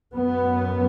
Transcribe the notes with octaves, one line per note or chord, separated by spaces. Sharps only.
F#2 B3